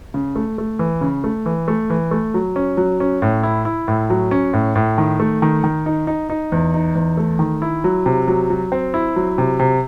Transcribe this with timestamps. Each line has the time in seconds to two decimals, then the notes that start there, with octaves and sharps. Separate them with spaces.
0.14 C#3
0.36 A3
0.58 A3
0.79 E3
1.01 C#3
1.24 A3
1.46 E3
1.68 A3
1.90 E3
2.11 A3
2.34 F#3
2.56 C#4
2.77 F#3
3.00 C#4
3.22 A2
3.43 E4
3.65 E4
3.88 A2
4.10 F#3
4.31 C#4
4.53 A2
4.76 A2
4.98 D#3
5.20 A3
5.42 D#3
5.64 D#3
5.86 D#4
6.07 D#4
6.30 D#4
6.52 E2
6.74 D#4
6.95 E2
7.17 A3
7.39 D#3
7.62 E4
7.84 F#3
8.06 C3
8.28 F#3
8.50 F#3
8.72 C4
8.94 E4
9.16 F#3
9.38 C3
9.59 C3